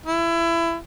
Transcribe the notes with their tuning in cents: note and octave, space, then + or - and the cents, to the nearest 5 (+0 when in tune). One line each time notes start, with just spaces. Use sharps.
E4 +25